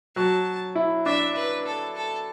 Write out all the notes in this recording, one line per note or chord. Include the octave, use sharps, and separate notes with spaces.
F#3 A5
E4
D4 E5
B4
A4
A4